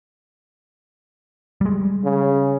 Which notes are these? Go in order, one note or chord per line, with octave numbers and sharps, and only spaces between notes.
G3 G#3
C#3